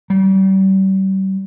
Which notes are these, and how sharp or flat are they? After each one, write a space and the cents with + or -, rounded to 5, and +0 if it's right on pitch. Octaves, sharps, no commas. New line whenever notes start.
G3 -35